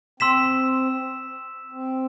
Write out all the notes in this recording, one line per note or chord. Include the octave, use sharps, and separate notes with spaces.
C4 C6 E6 B6 E7
C4